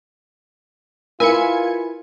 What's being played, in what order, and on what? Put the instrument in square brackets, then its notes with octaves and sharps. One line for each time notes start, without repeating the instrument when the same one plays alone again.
[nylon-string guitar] E4 B4 [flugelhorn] F4 [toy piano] A#4 [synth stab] G#5 G#6 C#7